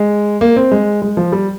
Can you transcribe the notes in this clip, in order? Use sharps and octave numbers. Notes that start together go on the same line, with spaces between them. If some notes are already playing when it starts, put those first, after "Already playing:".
Already playing: G#3
A#3
C4
G#3
G#3
F3
G3